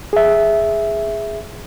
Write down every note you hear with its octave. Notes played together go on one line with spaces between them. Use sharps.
G#4 E5